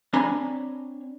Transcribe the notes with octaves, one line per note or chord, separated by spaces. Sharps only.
C4 D4 C#5 G#5 A#5 B5